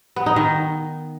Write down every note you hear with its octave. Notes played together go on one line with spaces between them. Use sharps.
B3
D#4
D#3